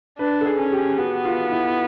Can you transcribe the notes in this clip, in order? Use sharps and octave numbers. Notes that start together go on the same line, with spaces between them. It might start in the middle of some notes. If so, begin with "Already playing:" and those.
D4 B4
A4
G#4
C#4
G4
B3 F#4
F4
E4